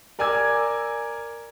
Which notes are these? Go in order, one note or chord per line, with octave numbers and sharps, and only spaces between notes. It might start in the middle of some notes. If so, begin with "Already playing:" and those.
A#4 D5 G#5 D6 E6 G#6